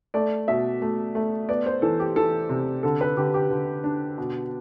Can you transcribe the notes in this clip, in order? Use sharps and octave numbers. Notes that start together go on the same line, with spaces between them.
A3 D5
B2 E5
A3
A3
B3 D5
C5
E3 A4
G4
E3 A4
C3
D3 A4
B4
D3 G4
G4
D3
D4
B2